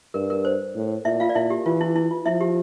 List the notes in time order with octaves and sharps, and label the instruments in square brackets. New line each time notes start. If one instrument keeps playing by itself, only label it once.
[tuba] G2 [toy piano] A#4
[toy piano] A#4
C5
[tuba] A2
[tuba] A#2 [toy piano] E4 E5
[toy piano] F4 F5
D5
[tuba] A#2 [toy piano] E4 E5
[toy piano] G4
[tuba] E3 [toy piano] F4
[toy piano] E4
E4
F4
[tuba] F3 [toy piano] E4 E5
[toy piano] G4